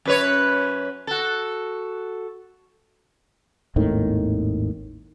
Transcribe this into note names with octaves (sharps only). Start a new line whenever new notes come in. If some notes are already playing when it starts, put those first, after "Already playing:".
F#2 B4 C#5
F#4 A4
G#1 D#2 A2 D#3